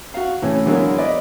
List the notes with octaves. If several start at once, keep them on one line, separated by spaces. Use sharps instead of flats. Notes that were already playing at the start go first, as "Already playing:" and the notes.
F#4 F5
A2 C#3 E3 C#4
D3 E3 F#3 G#3 A#3 B3
B4 D5 D#5